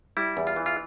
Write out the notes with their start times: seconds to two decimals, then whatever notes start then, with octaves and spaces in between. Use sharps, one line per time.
0.17 G3 E4
0.37 E2
0.47 F4
0.56 E3
0.66 F4